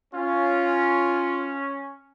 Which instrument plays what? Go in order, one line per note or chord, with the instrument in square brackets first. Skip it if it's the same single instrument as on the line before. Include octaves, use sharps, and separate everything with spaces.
[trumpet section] C#4 [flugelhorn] F4